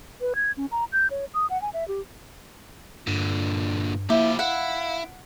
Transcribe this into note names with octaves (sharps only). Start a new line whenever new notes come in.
B4
G#6
C#4
A#5
G6
C#5
D#6
F#5
G#5
E5
G4
G2 A#2 D3
F3 A#3 E4 G4
E4 F5 F#5